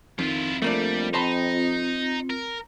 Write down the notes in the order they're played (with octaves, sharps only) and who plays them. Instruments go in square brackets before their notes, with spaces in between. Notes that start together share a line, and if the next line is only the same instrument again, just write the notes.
[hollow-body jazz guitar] F2 [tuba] D#3 [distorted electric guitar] E4 F4
[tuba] F2 [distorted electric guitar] G3 [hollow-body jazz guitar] A3 A#3 D4
[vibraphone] C4 G5 [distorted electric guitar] D#4 [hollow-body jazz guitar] C5 A5 B5
[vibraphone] C4 F4
[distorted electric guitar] A#4